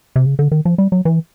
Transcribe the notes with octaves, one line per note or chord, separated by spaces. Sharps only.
C3
C#3
D3
D#3
F3
G3
F#3
E3